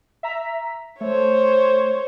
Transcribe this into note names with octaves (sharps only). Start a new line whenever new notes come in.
E5 A#5 B6
A3 C5 C#5